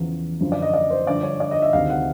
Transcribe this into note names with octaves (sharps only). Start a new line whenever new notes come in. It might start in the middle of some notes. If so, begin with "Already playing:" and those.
Already playing: E2 C#3 F3
F#2 D3 F3
D5
D#5
D5
C5
G2 D3 F3 D5
C#5
D5
D#5
E5
D2 C3 D#3 F5
F#5